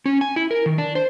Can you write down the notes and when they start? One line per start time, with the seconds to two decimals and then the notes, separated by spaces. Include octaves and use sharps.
0.06 C#4
0.21 G#5
0.36 E4
0.51 A#4
0.66 D#3
0.78 D4
0.95 C5